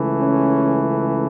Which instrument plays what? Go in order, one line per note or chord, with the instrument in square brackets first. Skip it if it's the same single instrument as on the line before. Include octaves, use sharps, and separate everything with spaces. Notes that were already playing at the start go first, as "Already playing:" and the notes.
Already playing: [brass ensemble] C#2 C#3 E3 A3
C#4